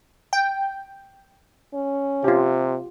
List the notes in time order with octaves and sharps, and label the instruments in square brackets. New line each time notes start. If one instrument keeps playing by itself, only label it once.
[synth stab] G5
[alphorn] C#4
[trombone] C3 [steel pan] F4 G4